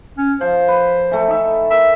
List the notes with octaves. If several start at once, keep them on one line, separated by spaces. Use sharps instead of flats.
C#4
F3 C5
B4
E3 A3
D#4 E5
A#4 E5